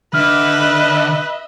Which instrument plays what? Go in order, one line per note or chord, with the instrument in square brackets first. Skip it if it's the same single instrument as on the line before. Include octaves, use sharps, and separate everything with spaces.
[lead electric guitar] D3 [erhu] B4 [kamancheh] D#5 E5 [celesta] F6